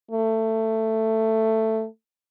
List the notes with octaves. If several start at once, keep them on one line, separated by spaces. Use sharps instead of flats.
A3